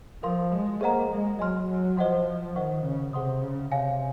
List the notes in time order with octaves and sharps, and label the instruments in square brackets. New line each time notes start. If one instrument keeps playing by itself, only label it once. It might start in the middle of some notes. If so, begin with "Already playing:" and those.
[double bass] F3 [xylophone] A#4 F5 C6
[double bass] G#3
[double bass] A#3 [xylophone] G#4 C5 D#5 F#5 A#5
[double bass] G#3
[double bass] F#3 [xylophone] D#5 G#5 C6 F6
[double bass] F#3
[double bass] F3 [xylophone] C5 D#5 F#5 C6
[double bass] D#3 [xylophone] C5 D#5 F#5 C#6
[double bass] C#3
[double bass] C3 [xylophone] G#4 C5 F#5 C6 D#6
[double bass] C#3
[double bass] C3 [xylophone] C#5 F5 G#5